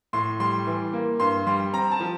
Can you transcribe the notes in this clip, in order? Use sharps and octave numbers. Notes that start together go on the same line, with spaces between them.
A2 C6
G3 C6
E3
A#3
G2 C6
G3 C6
C4 A#5
A5
F3